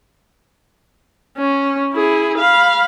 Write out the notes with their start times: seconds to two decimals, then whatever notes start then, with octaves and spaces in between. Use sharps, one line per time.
1.38 C#4
1.94 E4 G#4
2.38 F5 B5